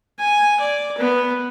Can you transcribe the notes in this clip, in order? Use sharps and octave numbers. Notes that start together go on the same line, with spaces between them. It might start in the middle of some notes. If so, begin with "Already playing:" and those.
G#5
D5
B3